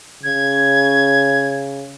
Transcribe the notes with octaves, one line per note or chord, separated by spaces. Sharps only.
C#3 G#6